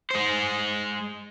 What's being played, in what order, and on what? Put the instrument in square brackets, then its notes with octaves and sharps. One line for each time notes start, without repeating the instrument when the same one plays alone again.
[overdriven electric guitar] G#3 C5